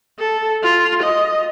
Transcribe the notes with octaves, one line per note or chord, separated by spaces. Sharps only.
A4
F4
D#5